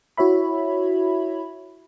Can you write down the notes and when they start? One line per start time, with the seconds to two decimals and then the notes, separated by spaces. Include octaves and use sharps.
0.17 E4 F#4 C#5 E5 B5